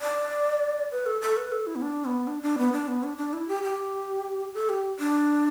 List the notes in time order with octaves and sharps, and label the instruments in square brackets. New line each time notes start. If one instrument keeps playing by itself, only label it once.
[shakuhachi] D5
B4
A4
A4
B4
A4
E4
B3
D4
B3
D4
D4
B3
D4
B3
D4
D4
E4
G4
G4
A4
G4
D4